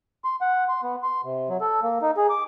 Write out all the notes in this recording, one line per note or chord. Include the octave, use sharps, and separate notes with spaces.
C6
F#5
C6
B3
C6
C3
F#3
A4
A#3
D#4
G#4
D6